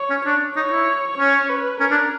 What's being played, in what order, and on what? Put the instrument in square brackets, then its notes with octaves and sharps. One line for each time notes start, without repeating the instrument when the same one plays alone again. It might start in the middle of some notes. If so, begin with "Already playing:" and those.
Already playing: [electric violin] C#5
[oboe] C#4
D4
[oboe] D#4 [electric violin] C#5
[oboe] E4
[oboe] C#4 [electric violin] C#5
[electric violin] B4
[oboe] C#4 [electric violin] A#4
[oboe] D4